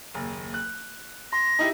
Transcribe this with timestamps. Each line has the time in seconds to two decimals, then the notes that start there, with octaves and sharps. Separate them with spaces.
0.15 F#1 D#2
0.54 F#6
1.33 C6 A#6
1.59 D#4 E4 G4